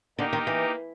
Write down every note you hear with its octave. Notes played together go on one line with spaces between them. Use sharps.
D3 A#3 D#4 G4 A#4
D#3
E3